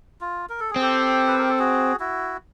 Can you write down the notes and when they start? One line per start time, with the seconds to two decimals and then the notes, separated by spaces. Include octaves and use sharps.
0.21 F4
0.49 A#4
0.60 A4
0.71 G#4
0.76 C4
0.81 G4 A4
1.27 B4
1.38 A#4
1.49 A4
1.59 F#4 G#4
2.00 E4 F#4